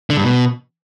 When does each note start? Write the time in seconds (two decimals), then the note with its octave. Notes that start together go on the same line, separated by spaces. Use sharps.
0.10 D3
0.17 G2
0.24 B2